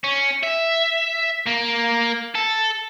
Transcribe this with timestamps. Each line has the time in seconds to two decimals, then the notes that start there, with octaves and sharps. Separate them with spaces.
0.04 C#4
0.43 E5
1.47 A#3
2.35 A4